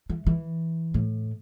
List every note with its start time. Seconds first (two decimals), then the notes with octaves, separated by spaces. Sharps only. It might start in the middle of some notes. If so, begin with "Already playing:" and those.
0.10 E3
0.27 E3
0.94 A2